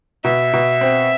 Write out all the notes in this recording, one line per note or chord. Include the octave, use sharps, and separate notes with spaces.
B2 E5
B2
C4